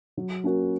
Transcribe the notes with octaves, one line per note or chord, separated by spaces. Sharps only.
F#3
A#3 C#4 F#4